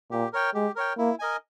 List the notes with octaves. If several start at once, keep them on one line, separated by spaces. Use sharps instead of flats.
A#2 G4
A#4 C#5 G5
G#3 G4
A#4 C#5 G5
A#3 E4
A#4 D#5 G#5